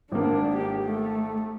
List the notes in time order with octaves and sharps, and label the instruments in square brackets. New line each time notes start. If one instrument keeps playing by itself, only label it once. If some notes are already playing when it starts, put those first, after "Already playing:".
[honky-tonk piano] G#1 A#3 [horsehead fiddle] D4
[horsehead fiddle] G4
A3